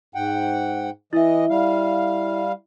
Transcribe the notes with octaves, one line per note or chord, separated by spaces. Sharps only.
G#2 F#5 G5
E3 E4 D#5 E5
G3 F5